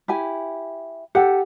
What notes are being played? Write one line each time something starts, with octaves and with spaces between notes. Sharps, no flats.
E4 G4 G#5
G4 A4 F#5